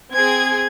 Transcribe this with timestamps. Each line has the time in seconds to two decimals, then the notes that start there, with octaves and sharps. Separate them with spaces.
0.13 C4 G#4 G#6